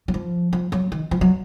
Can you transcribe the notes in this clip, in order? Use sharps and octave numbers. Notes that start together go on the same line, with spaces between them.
F#3
F3
F3
F#3
D#3
F3
F#3